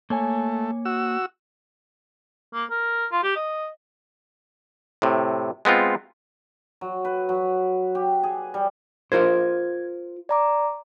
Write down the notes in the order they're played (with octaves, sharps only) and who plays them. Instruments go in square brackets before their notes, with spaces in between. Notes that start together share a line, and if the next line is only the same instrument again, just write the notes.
[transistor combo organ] A3 [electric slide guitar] A#3 C#5 G#5
[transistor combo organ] F#4 E6
[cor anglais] A#3
A#4
F4
G4
D#5
[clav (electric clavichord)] A2 C3
G#3 B3 C4 F4
[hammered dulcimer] F#3
B4
F#3
G4
G#4
G3
[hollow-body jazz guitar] F4 A#4 C5 [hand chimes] G#6
[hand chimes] D5 A#5 D6